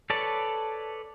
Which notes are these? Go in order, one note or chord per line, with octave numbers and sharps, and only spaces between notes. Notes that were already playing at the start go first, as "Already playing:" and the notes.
A4 B4 C#5 D5 A5